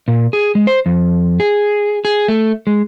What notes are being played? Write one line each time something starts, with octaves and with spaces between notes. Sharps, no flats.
A#2
G#4
G#3
C5
F2
G#4
G#4
A3
G#3